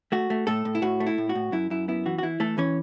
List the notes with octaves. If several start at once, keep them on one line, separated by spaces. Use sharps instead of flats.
A3 F#4
A3
A2 A3 A4
A2
E4
A2 F#4
A3
E4
A2
F#4
A2
F#2 E4
F#2 E4
B3 E4
E3 F#4
F#4
E3 E4
E3 A3 A4
E3 C#4 C#5